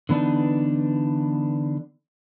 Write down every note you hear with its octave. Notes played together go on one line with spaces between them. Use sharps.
D3 E3 B3 D4 D#4